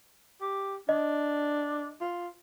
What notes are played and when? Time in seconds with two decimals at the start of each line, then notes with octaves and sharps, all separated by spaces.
0.41 G4
0.89 D4 D#5
2.01 F4